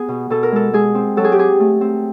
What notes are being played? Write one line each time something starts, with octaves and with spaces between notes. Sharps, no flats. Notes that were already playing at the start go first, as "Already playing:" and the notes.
Already playing: B3 G#4
B2
B2 A4
A#4
G#3 A4
G#3 G#4
C4
F#3 A4
G#4
G4
C4 G#4
A3
C4